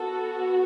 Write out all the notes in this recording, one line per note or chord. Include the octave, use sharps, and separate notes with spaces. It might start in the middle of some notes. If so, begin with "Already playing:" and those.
Already playing: B3 F#4 A4